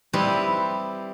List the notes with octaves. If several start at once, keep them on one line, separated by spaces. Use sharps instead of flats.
G3 C4 E4 G4 B4 D#5